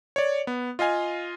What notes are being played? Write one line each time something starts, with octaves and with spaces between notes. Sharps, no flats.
C#5 D5
B3
F4 D#5 F5 G#5